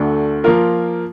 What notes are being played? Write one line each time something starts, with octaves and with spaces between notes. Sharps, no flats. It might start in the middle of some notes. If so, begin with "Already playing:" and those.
Already playing: D2 D3 A3 D4
F3 A#3 F4 A#4